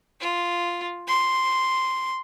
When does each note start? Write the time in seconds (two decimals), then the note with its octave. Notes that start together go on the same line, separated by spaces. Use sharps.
0.21 F4
1.07 C6